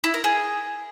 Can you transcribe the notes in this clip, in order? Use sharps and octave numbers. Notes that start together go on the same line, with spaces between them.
E4
A#4
G#4